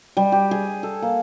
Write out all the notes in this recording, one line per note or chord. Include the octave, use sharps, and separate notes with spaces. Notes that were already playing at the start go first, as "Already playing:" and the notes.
G3
G4
G#4
A4
A#3